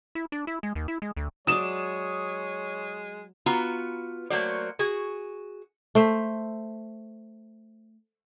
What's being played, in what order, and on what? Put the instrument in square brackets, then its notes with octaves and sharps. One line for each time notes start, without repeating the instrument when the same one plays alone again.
[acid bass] E4
D4
E4
G#3
D#2
E4
G#3
D2
[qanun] F#3 D5 D6 [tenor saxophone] G#3 [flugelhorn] C#5 [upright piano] D#6 E7
[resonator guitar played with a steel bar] B3 F4 F#4 B4 A#5
F#3 A3 A#3 F#4 C5 D5
F#4 G#4
[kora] A3 C5 E5